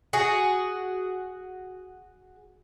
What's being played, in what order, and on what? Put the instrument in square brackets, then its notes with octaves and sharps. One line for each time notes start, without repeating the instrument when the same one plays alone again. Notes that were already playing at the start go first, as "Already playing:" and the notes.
[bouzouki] F#4 G#4